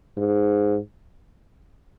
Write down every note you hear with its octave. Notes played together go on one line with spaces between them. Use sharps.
G#2